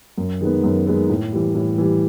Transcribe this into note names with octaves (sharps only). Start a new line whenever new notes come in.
F#2
D#3 G#3 B3
F#2
D#3 G#3 B3
A2
E3 G3
A2
E3 G3